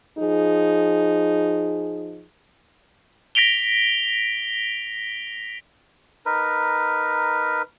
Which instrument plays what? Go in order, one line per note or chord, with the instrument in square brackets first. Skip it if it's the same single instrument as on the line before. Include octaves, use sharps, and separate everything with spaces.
[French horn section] F3 D#4 G#4
[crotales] A#6 B6 D7 F7 G7
[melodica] D#4 A#4 B4